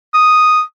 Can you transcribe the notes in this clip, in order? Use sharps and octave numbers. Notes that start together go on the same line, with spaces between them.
D#6